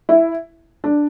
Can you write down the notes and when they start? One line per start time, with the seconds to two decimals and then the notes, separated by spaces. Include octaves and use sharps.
0.09 E4
0.84 D4